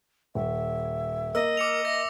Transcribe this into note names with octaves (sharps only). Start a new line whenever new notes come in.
D#1 E5
A#3 D#5 E6
A#4 D6 C#7 F7
E5 A#6